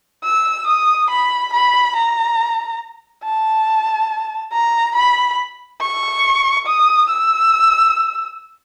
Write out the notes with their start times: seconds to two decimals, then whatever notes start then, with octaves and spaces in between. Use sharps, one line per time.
0.24 E6
0.67 D#6
1.10 B5
1.53 B5
1.96 A#5
3.24 A5
4.52 A#5
4.96 B5
5.80 C#6
6.67 D#6
7.10 E6